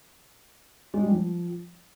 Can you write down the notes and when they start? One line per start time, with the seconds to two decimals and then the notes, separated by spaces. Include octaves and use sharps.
0.94 G#3
1.03 G3
1.11 F3